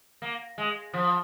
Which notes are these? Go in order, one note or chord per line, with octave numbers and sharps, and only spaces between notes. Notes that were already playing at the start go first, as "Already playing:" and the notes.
A#3
G#3
F3